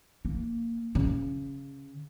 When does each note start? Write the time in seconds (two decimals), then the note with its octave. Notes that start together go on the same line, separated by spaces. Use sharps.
0.25 A#3
0.95 C#3